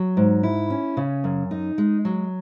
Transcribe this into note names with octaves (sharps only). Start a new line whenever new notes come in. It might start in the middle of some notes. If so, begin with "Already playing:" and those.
Already playing: F#3
G#2
E4
C#4
C#3
F#2
D#4
G#3
F#3